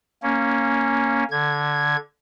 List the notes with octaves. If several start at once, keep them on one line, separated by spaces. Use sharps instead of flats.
A#3 C#4
D3 G#6